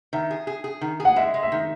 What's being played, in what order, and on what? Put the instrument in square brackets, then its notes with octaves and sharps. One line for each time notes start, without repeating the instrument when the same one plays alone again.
[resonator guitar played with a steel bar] D#3 [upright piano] E5
[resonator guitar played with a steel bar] G#4
G#4
G#4
D#3
G#4
[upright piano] F#5
[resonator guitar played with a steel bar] G#3 [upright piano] E5
[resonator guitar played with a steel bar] G#3
[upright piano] E5
[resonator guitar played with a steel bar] D#3